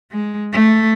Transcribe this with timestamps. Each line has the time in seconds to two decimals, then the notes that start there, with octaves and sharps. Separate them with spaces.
0.12 G#3
0.53 A3